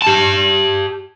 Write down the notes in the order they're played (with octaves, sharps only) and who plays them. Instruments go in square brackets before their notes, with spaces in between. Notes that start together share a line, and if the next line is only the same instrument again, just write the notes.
[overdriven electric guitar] G4 A5